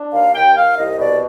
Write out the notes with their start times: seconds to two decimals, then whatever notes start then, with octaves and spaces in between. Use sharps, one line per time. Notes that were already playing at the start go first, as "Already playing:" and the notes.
Already playing: D4
0.12 D#2 F5
0.33 D#2 G5
0.55 D#2 F5
0.77 C2 D#5
0.98 B2 D5